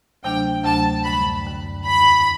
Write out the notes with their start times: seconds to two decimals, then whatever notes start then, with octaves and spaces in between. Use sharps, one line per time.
0.23 D2 C3 F#3 A3 D4 G5
0.64 D2 C3 F#3 A3 D4 A5
1.04 F#2 D3 G3 B5
1.45 F#2 D3 G3
1.85 E2 D3 G3 B5